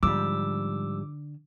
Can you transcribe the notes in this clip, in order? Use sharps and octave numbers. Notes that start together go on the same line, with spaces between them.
G#2 D3 F3 G3 D6 E6